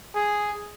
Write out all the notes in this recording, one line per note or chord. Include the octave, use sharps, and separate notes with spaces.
G#4